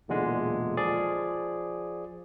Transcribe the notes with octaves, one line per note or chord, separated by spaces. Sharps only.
B1 E2 A#2 D3 G#3
F3 G#4 D5